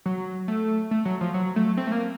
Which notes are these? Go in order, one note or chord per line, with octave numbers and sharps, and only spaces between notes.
F#3
A3
A3
F#3
F3
F#3
A3
C4
A3
A#3